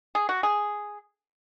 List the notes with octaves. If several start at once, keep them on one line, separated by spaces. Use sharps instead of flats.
G#4
F#4
G#4